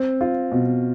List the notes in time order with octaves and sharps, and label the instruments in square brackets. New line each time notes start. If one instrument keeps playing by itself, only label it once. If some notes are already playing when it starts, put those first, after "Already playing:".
Already playing: [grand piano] C4
F4
B2